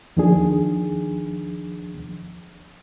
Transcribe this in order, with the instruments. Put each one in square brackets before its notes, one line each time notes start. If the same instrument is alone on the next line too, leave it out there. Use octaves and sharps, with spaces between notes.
[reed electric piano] D#2 D#3 F3 D4 G#4